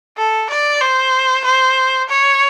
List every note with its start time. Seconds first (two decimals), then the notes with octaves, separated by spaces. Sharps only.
0.17 A4
0.50 D5
0.81 C5
1.45 C5
2.09 C#5